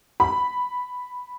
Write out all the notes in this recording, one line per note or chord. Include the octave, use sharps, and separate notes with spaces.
B5